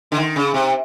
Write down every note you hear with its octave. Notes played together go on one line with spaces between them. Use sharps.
D3
D#3
C#3
C3